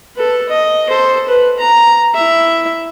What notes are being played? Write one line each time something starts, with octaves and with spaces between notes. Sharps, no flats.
A4 B4
D#5
A4 C5
B4
A#5
E4 E5